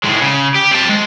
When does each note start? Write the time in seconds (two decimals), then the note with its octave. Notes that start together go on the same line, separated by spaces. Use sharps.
0.04 A2 G#3
0.21 C#3
0.55 G4
0.71 C4 A5
0.89 G#3